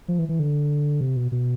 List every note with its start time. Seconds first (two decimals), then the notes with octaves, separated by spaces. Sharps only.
0.08 F3
0.19 E3
0.29 E3
0.39 D3
1.01 C3
1.16 B2
1.32 B2